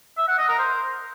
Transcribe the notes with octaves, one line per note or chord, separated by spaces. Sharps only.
E5
F#5
D#5
A#4
C5